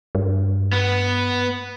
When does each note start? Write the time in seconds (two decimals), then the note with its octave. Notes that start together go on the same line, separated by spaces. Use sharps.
0.15 G2
0.73 B3